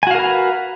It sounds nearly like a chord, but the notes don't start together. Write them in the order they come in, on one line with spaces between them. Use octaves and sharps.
G#5 F#4 F5 A#4 B4